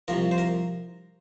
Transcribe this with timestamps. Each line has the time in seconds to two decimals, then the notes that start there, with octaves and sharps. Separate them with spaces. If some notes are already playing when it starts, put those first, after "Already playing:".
0.08 C2 C3 F3 A#4
0.31 C5
0.38 A#4